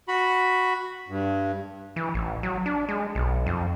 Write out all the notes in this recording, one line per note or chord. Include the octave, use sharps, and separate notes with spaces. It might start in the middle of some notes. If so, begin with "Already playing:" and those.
F#4 B5
G2
E3
A1
F#3
D4
G#3
B1
F2